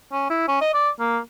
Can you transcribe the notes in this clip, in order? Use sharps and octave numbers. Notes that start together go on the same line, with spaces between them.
C#4
E4
C#4
D#5
D5
A#3